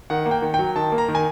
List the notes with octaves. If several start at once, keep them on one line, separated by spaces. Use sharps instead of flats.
D#3 F#5
A#3
G5
D#3
G5
F#3
D#3 A5
A#3
A#5
D#3
G#5